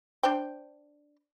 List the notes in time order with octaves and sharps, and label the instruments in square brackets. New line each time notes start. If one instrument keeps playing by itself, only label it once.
[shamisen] D4 C5 G5